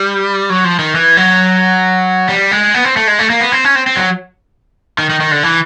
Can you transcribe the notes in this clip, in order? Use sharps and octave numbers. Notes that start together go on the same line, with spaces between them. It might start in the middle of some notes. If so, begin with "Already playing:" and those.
Already playing: G3
F#3
F3
D#3
E3
F#3
G3
G#3
B3
C4
A3
G#3
A3
A#3
B3
C4
C#4
C4
C4
F#3
D#3
D#3
D#3
D3
E3